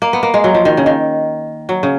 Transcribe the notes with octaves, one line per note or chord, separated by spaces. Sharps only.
A#3
B3
A#3
G#3
F#3
F3
D#3
C#3
D#3
F#3
C#3